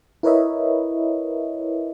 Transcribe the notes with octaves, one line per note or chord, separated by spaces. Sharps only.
E4 A#4 B4 C#5 D#5 E5